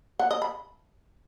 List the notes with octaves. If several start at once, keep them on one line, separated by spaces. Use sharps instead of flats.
F#5
D#5
B5